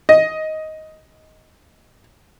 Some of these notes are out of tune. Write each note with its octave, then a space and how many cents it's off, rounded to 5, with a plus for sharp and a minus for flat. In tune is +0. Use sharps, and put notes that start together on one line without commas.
D#5 +10